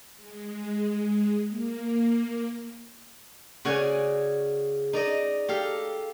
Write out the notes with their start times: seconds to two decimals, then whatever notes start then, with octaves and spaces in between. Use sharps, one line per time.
0.16 G#3
1.49 A#3
3.65 C#3 F#4 C#5 D5 G#5
4.93 D#4 D5 D#5
5.49 G4 A4 F5